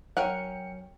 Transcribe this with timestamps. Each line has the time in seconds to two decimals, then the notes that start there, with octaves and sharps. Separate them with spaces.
0.17 F#3 C#4 A#4 F#5 G5 C#7